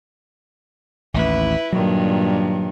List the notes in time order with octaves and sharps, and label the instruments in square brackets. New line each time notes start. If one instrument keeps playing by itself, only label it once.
[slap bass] A1 D#2 [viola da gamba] E4 B4
[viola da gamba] G2 A#2 D#3 [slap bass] F#3